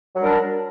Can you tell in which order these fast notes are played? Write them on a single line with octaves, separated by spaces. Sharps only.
F#3 G3 A#4 D4